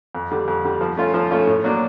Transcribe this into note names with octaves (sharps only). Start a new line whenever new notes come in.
F2
D3 G3
F2
D3 G3
F3
A3 C#4 F4
F3
A3 C#4 F4
A2
F#3 A#3 D4